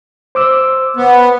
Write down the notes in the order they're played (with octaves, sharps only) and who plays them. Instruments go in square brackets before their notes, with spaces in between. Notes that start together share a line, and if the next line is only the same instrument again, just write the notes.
[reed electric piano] C5 D6 E6
[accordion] B3